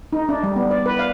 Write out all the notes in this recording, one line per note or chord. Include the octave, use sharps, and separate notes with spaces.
D#4
D4
G3
B3
D5
B4
F5